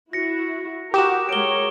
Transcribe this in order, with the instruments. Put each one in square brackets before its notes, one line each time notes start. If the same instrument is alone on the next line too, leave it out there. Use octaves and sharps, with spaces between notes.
[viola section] E4 F#4 [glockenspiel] A#6 C#7
[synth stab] F#4 G4 [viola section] A#4 [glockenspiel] D6 D#6 E7
[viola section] G#3 A#4 C#5 [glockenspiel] D7 G7